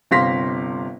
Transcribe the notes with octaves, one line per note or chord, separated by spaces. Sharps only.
G1 C3 F5 C6 A#6 B6